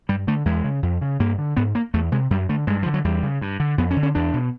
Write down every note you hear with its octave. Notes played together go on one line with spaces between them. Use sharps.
G2 G3
D3 A3
E2 G#3
C#3
F2
C#3
G2 A#3
D3
G#2 B3
A#3
E2 A3
C3 G#3
F#2 G3
D3 A3
G2 G#3
D3 F3
F#3
E2 G3
C#3
G2
D3
F2 B3
C#4
D3
C#4
E2 D4
B2